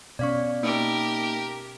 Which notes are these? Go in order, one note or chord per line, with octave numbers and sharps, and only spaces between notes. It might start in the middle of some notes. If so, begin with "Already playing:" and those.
B2 C#4 D5 F5 C#6
A#3 D#4 G4 A#4